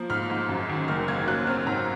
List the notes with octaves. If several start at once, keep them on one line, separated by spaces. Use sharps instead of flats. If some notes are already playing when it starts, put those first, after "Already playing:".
Already playing: F3 A#3
G#2 F6
G#2
F#2
D#3
F#1 F6
A#3 G#6
F#3 F#6
C4 F6
G#2 A#5